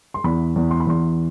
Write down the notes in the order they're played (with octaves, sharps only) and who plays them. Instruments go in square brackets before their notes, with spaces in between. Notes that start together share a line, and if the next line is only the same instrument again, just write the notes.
[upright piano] C6
E2 B5
E2
C6
B5
E2 C6